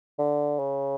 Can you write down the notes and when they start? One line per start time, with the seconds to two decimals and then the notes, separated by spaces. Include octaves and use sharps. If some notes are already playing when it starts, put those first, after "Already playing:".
0.19 D3
0.59 C#3